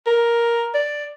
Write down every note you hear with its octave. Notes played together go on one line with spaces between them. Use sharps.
A#4
D5